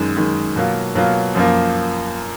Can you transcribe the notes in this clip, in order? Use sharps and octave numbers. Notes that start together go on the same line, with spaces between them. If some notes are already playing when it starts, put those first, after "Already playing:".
Already playing: F#2 D#3 G#3
F#2 D#3 G#3
B2 F#3 A#3 F4
B2 F#3 A#3 F4
F#2 F3 A#3